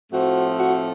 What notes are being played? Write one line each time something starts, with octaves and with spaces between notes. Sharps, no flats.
A2 F3 A3 C4 F#4
F#4